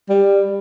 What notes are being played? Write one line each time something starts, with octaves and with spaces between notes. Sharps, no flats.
G3